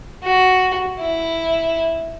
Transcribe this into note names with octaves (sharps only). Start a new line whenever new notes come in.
F#4
E4